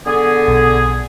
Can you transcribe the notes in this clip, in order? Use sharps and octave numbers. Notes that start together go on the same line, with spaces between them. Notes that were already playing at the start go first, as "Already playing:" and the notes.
D3 B3 G#4
B1